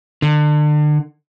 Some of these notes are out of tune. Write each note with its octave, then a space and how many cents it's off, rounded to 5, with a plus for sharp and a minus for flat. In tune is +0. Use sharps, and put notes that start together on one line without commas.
D3 +35